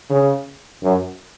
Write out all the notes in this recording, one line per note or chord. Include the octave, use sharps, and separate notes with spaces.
C#3
F#2